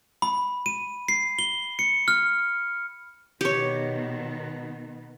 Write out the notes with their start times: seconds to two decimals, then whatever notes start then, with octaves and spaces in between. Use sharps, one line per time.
0.22 B5
0.66 D#7
1.08 C7
1.39 G7
1.79 C#7
2.08 F6
3.41 B2 D#3 B3 G4 C#5